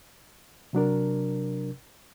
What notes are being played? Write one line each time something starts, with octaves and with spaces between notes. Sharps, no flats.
C3 F#3 D4 A#4